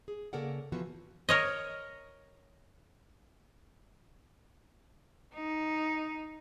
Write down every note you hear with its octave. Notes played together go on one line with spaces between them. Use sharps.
G#4
C#3 A#3 A4 A#4 D5 F#5
E3 F3 B3 F#4
A#4 C#5 D#5
D#4